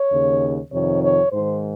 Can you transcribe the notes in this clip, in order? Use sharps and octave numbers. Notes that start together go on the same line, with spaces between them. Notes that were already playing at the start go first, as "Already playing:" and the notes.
Already playing: C#5
D#2 C#3
F2 C3 D#3 C#5
C#5
G#2 D#3 C5